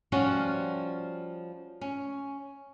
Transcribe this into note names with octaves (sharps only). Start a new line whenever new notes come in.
F3 G3 C#4 F4 F#4
C#4